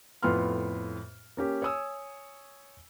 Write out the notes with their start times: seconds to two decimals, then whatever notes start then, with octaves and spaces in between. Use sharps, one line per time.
0.23 F2 A2 B3 F4 C6 F6
1.37 A#3 C#4 G4
1.62 C#5 G#5 D#6 E6